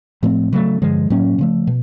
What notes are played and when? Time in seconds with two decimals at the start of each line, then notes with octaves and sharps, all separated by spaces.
0.23 A2 F3 A3 C4
0.53 C#3 F#3 A3
0.82 G2 D3 F3 G#3
1.10 A2 F#3 A#3 C#4
1.38 C#3 F3 A3
1.67 B2